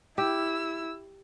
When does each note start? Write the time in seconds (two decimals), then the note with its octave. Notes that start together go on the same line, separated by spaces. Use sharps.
0.18 E4 G4 E6